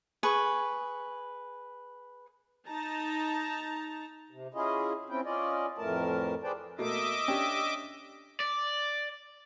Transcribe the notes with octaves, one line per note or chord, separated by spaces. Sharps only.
G#4 B4 C#6
D#4 A5 A#5
C3
C#4 E4 F4 G#4 D#5
C4 C#4 E4 G5
C#4 F4 D5 D#5
F2 A2 E3 A3 A#4 A5
G#4 B4 C5 D5 G5 A5
B2 A3 A#3 D#5 E5 D6
C#4 D4 G4
D5